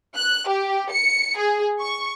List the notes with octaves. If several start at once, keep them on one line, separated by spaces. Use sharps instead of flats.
F#6
G4
C#7
G#4
C#6